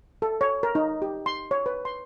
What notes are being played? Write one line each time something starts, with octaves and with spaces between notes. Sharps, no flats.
A4
C#5
A#4
D#4
G4
C6
C#5
B4
C6